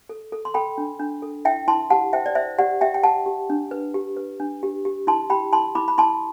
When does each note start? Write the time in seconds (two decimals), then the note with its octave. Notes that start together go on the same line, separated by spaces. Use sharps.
0.09 A4
0.32 A4
0.45 C6
0.54 A4 G5 B5
0.78 D4
1.00 D4
1.22 A4
1.45 E4 E5 G5
1.68 E4 A5 C6
1.90 G4 F#5 A5
2.13 C5 E5 G5
2.26 D5
2.35 C5 E5
2.58 G4 D5 F#5
2.81 G4 E5 G5
2.94 G5
3.03 G4 F#5 A5
3.26 G4
3.50 D4
3.71 B4
3.94 G4
4.17 B4
4.40 D4
4.63 G4
4.85 G4
5.07 E4 A5 C6
5.30 G4 G5 B5
5.53 E4 A5 C6
5.75 E4 B5 D6
5.88 B5
5.98 E4 A5 C6